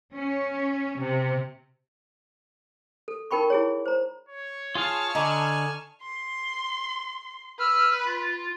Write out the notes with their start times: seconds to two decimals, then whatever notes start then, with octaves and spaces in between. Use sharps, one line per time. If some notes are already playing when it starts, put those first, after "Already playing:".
0.15 C#4
1.00 C3
3.08 A4
3.31 D#4 A#4 G5 B5 C#6
3.50 E4 G#4 C#5
3.86 C5 A#5
4.29 C#5
4.75 F4 G#4 F5 A5 C#6 F6
5.15 D3 D#5 G#5 A#5 D6
6.02 C6
7.59 B4 E6 F6
8.06 F4